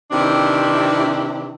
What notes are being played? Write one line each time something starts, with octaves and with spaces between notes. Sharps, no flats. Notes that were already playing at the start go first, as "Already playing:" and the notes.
C3 D#3 E3 C4 D4 E4